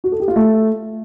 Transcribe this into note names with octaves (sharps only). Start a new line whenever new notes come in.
F#4
A4
G4
F4
A3